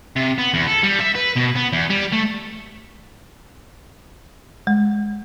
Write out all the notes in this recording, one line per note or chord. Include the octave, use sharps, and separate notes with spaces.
C3
B3
E2
A4
G3
E5
B4
B2
B3
E2
G3
A3
G#3